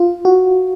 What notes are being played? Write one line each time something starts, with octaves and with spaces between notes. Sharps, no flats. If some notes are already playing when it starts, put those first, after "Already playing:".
Already playing: F4
F#4